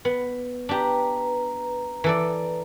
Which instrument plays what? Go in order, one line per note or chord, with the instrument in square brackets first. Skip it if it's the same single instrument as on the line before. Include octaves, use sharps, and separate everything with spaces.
[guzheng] B3
[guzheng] D4 G4 [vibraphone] B4 A#5
[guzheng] E3 A4 D5